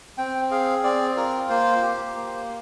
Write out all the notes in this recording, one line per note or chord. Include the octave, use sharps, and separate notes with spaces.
C4 G5
G#4 F5
C4 D5
F4 A#4
A#3 C5
G4
A#3